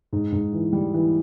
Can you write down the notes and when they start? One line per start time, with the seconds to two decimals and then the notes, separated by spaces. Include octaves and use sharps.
0.13 G#2
0.32 G#2
0.53 E3
0.73 G3
0.94 E3